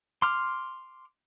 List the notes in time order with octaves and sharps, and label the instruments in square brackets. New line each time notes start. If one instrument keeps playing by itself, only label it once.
[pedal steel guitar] C6 D6 F6